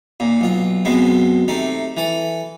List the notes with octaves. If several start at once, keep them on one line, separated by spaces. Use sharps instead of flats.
D#2 A#2
B1 F4
F#2 B2 G#3 B3 C4
C3 A3 D#4
E3 A4